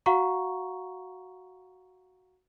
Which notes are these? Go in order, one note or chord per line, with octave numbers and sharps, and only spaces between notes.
F#4 F5 F#5 A#5 C#6